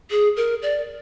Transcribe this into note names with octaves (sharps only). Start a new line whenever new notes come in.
G#4
A#4
D5